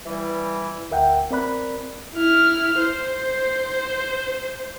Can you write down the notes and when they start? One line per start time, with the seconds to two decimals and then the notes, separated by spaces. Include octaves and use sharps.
0.06 E3 G3
0.91 D2 A#4 E5 F#5 G5
1.31 C4 A#4 D5 B5 F#6
2.15 E4 F6
2.80 C5